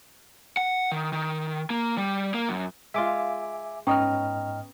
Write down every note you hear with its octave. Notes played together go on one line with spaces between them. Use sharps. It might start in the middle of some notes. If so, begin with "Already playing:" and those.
F#5
D#3
D#3
A#3
G3
A#3
F#2
G#3 F4 E5 G#5 D6
G#2 B3 C#4 D#5 G5 A#5 D#6 F6